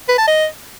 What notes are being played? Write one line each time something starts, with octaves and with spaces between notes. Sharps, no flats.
B4
A5
D#5